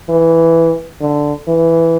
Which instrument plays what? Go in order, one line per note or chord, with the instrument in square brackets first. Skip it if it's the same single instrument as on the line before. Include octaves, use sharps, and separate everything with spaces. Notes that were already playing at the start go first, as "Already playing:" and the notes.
[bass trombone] E3
D3
E3